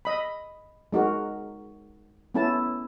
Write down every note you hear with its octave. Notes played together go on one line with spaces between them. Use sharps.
D#5 B5
G#3 D#4 F#4 A#4
B3 C#4 E4 A4 A5